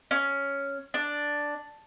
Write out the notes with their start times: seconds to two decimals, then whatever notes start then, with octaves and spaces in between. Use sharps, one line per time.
0.11 C#4
0.94 D4